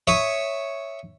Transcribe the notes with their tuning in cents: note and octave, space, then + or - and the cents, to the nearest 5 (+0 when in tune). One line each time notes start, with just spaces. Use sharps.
C#5 +0 E5 +0 D#6 +0